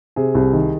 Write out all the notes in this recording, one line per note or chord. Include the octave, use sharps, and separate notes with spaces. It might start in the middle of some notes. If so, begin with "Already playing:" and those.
C3 G#4
C2
D#3